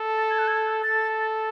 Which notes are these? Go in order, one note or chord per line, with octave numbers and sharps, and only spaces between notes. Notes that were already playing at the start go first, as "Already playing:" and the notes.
Already playing: A4
A6
G#6
F#6
G#6
A4 A6